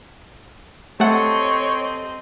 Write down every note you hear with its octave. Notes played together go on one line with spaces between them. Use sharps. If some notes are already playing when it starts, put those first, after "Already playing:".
A3 C4 G4 A4 C#5 D#5 F#5